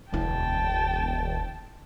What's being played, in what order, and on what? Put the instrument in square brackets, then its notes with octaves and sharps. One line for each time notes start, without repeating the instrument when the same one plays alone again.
[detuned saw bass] E1 [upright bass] D2 E4 [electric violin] G5 A5